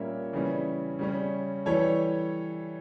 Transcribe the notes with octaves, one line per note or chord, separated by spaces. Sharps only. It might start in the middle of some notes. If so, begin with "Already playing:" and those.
Already playing: A#2 G3 A#3 C#4 C#5 E5
C#3 E3 G3 C#4
C#3 G3 C#4
E3 G3 A4 C#5